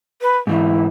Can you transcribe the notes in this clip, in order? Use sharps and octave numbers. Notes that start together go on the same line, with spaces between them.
B4
G#2 E3 E4